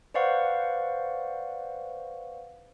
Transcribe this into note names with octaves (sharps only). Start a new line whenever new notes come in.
B4 C5 D5 F5 F#5 C#6